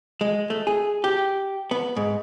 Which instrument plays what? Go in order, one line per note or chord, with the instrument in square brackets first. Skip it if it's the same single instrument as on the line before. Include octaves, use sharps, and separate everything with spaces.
[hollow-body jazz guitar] G#3
A3
G#4
G4
B3
G#2